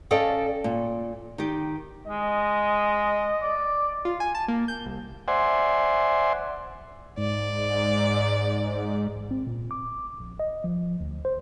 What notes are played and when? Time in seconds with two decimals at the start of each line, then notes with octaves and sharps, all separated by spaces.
0.11 C#4 A4 D5 D#5 F5 G5
0.64 A#2
1.38 D#3 G4
2.07 G#3 D#5
3.42 D5
4.05 F4
4.20 G#5
4.35 A5
4.48 A#3
4.68 G6
4.85 C2
5.28 C5 D5 E5 F#5 G#5 C6
7.17 G#2 D5
9.16 A1
9.31 C4
9.47 A#2
9.71 D6
10.20 A#1
10.40 D#5
10.64 F3
11.00 D2
11.25 C5